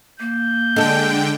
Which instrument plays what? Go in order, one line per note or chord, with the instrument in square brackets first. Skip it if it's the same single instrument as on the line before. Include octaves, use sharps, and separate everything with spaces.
[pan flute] A#3 [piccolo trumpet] G6
[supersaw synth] D3 G5 [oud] G#3 A4